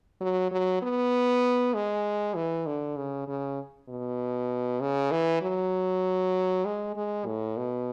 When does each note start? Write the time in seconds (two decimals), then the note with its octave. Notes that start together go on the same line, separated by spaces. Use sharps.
0.21 F#3
0.51 F#3
0.82 B3
1.74 G#3
2.36 E3
2.67 D3
2.97 C#3
3.28 C#3
3.89 B2
4.81 C#3
5.12 E3
5.42 F#3
6.65 G#3
6.96 G#3
7.27 A2
7.57 B2